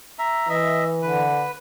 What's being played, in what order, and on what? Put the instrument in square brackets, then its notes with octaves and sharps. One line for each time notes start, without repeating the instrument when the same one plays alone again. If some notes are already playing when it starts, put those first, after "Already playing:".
[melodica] E5 A#5
[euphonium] E3 [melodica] D#5 E5
[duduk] D3 [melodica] B4